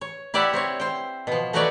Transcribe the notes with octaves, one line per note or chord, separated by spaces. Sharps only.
C#5
E4 G4 D5 E5 F#5
C4 E4 C#5
C5 G5
B2 F3
A3 D#4 F#4 B4 C#5 D5